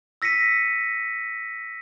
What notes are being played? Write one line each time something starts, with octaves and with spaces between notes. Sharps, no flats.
E6 A#6 B6 C#7 D#7